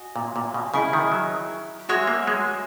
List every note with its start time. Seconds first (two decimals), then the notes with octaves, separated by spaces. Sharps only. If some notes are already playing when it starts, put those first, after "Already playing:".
Already playing: F#4 D#5 G#5
0.16 A#2
0.36 A#2
0.54 B2
0.73 C#3 E4 G#4 D#5 G#5
0.93 D#3
1.12 F#3
1.89 G#3 F#4 C#5 E5 G#5
2.07 A#3
2.27 G#3